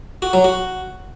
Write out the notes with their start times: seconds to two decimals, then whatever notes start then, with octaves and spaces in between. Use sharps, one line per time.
0.22 F#4
0.33 F#3
0.44 F#4